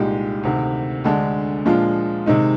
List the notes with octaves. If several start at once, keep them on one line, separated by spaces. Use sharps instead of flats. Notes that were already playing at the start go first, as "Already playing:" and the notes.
Already playing: C2 A#2 G#3 D#4 G4
D2 C3 D#3
D2 D3 G#3 D4
A#2 F3 G#3 D4 F4
C3 D#3 G#3 D#4